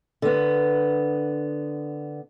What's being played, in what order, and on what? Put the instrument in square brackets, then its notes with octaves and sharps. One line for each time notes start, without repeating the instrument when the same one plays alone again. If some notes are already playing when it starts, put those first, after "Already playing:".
[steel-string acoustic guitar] D3 B3